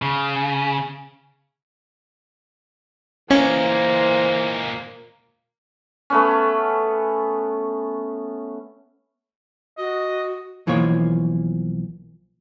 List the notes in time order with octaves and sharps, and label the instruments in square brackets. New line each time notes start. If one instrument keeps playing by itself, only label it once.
[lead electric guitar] C#3
[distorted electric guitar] A#2 G#3 [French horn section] E3 C5 [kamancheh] A#3 [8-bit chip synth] C#4
[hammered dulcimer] A3 B3 C#4
[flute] F#4 [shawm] D#5
[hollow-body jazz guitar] B1 E3 F3 A#3 C#5